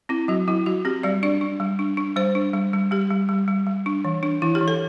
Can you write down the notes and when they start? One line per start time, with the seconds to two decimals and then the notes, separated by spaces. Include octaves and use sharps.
0.09 C4 E4
0.28 F#3 F#4
0.48 F#3 E4
0.66 F#3 F#4
0.85 C4 G4
1.03 G3 D5
1.23 D4 D5
1.41 D4
1.60 G3
1.79 D4
1.97 D4
2.16 G3 C5
2.35 D4
2.54 G3
2.73 G3
2.91 G3 G4
3.10 G3
3.29 G3
3.48 G3
3.67 G3
3.86 D4
4.05 E3
4.23 D4
4.42 E3 E4
4.55 G4
4.61 E3
4.68 A4